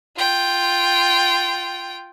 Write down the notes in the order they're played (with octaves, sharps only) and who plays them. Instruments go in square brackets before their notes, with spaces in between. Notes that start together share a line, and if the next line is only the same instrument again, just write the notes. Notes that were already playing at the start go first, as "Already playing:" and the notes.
[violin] F4 G5